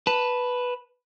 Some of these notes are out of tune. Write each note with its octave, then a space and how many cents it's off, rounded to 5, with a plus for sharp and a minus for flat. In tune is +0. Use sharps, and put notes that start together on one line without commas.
B4 +0 A5 +0